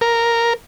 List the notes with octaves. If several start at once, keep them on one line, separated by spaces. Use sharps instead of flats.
A#4